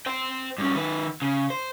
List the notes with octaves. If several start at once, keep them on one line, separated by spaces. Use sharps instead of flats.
C5 G5
G2 C#4
D#3 B4
C#3
C5